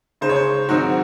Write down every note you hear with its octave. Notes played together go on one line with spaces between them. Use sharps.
C#3 G#3 D#4 C5
C#5
C5
G#2 D#3 F#3 C4 D#4 F#4